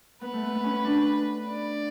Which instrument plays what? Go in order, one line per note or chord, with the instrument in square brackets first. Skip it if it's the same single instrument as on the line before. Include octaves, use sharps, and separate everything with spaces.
[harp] B3 [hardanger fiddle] B4
[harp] A3
B3
B3
C#4
D4
[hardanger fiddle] D5